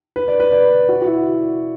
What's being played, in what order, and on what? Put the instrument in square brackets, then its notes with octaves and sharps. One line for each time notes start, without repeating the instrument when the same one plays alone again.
[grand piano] B4
D5
B4
D5
F#4
F#4
E4